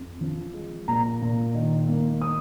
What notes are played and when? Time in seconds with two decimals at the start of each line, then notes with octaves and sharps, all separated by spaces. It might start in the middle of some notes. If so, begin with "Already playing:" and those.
Already playing: F2
0.21 F3
0.54 G#3
0.88 A#2 A#5
1.22 A#2
1.54 D#3
1.89 A#3
2.21 D#6